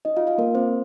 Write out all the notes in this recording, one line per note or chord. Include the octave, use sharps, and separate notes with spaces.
D#4 D#5
F4 F5
F4 F5
A#3 A#4
C4 C5